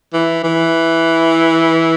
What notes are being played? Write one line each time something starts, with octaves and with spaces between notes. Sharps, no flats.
E3
E3